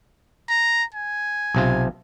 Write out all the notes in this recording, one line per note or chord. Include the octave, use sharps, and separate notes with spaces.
A#5
G#5
B1 C3 F4